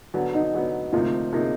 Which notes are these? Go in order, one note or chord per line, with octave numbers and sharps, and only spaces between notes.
D3 F#3 B3
D#4
D3 F#3 B3
D2 C3 F3 A#3 D#4 F4
C3 F3 A#3 D#4